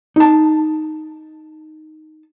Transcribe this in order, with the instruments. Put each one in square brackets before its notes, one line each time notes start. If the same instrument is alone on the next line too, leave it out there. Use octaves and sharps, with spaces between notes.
[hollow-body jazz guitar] D#4 A5